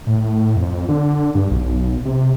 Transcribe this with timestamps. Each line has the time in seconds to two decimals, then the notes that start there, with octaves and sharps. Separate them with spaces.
0.07 A2
0.56 F2
0.89 D3
1.35 G2
1.51 B1
2.05 C3